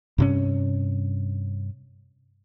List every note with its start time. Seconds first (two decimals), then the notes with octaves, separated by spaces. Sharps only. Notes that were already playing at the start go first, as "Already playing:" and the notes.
0.18 G2 C3 C#4